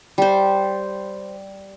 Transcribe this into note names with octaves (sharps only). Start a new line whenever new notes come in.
G3 C5